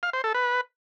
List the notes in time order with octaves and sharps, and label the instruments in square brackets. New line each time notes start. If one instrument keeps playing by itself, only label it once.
[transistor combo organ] F5
C5
A4
B4